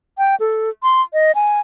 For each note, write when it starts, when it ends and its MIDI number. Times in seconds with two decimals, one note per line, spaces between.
0.18 0.35 79
0.40 0.70 69
0.83 1.02 84
1.13 1.32 75
1.35 1.60 80